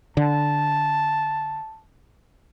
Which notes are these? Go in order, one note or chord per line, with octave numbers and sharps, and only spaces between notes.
D3 A5